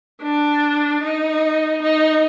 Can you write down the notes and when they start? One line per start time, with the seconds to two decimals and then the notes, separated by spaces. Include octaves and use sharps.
0.23 D4
1.03 D#4
1.83 D#4